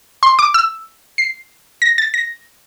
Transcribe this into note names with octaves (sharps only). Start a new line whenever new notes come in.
C6
D6
E6
C7
A#6
A6
A#6